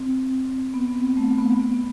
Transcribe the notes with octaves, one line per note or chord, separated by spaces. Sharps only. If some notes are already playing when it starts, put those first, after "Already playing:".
Already playing: C4
B3
C4
A3
B3
B3